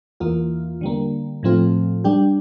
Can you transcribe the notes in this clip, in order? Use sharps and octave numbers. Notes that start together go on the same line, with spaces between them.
E2 E3 A#3 F4
D3 G3 A#3
A2 F3 A3 C4 F4
G3 D4 G4